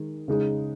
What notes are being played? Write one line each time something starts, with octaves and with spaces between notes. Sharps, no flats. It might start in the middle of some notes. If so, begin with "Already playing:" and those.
Already playing: D#3 G#3 G#4
C#3 G#3 D#4 G#4